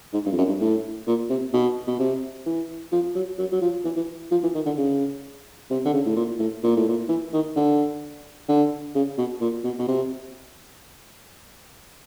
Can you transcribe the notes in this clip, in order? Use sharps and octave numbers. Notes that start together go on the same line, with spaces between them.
G#2
G2
F2
F#2
G2
A2
A#2
C3
B2
B2
C3
E3
F3
F#3
F#3
F#3
F3
E3
E3
F3
E3
D#3
D3
C#3
C3
D3
C#3
A2
A#2
A2
A#2
A2
A#2
E3
D#3
D3
D3
C#3
B2
A#2
B2
B2
C3